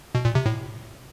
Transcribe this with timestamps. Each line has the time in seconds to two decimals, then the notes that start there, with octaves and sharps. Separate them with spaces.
0.15 B2
0.25 A#2
0.35 C3
0.46 A2